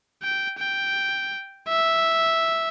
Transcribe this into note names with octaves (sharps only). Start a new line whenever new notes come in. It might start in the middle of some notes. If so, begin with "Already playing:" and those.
G5
G5
E5